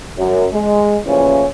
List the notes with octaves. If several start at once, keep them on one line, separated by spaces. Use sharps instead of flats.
F#2
G#3
A1 A#2 C#3 E3 F3 C#4